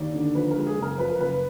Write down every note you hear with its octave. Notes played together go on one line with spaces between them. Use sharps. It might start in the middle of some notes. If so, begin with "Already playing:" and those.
Already playing: D#2 D5
D3
F3 B4
G#3 A#4
G#4
F#1
A#4
F3 B4
A#4
F#1 B4